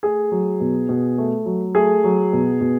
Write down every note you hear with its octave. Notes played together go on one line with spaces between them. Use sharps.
A3 G#4
F#3
B2
B2
A3
F#3
A3 G#4
F#3
B2
B2